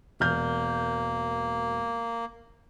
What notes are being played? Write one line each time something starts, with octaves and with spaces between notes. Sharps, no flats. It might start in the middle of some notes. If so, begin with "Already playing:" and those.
E1 A#3 F6 G6